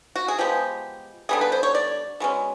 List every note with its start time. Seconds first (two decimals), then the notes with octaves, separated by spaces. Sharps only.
0.16 F#4
0.28 G#4
0.39 F3 G#3 B3 G4
1.29 D3 G3 B3 G#4
1.41 B4
1.52 C5
1.63 C#5
1.75 D5
2.20 B2 G#3 C#4